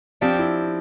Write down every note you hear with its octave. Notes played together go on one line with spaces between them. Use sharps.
F3 C4 D4 G4
E4